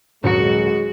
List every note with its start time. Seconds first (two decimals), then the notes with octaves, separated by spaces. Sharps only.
0.24 D#1 F#3 G#3 F#4 C#7